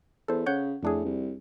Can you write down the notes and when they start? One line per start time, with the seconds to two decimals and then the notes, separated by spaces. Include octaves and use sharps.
0.28 E2 A4 C5
0.46 C#3 C#5 F#5 G6
0.83 F2 A2 D4 G#4
1.05 C2